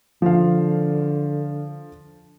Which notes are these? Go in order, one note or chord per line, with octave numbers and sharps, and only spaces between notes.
D3 F3 F5